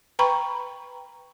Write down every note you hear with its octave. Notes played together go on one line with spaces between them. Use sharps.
B4 G5 A#5 B5 C#6